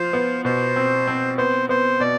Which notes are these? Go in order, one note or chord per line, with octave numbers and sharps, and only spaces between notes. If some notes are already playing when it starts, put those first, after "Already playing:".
Already playing: F3 F4 C5
B3
B2 C5
C4
C4
B3 C5
B3 C5
B2 D5